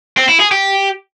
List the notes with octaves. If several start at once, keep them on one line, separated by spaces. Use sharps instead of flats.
C4
E4
G#4
G4